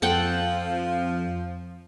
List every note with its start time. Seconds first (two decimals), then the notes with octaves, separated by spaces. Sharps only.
0.02 F2 F3 A4 F#5 G5